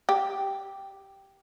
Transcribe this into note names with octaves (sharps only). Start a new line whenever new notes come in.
G4